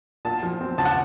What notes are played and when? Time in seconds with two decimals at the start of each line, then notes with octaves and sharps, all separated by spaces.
0.25 A#2 A5
0.43 F3
0.61 C4
0.78 C#2 A5
0.85 F#5